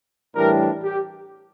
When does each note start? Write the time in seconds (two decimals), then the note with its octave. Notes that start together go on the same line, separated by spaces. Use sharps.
0.35 A2 E3 G3 D4 A#4
0.83 G4